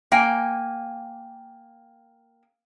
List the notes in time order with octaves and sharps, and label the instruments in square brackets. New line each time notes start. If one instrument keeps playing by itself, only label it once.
[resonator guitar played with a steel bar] A#3 G5 G#5